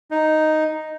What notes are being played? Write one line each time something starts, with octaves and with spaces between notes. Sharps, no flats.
D#4